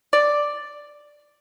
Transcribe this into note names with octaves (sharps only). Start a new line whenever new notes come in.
D5